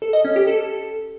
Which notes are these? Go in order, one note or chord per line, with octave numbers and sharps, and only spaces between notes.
A4
D#5
C#4
G4
A4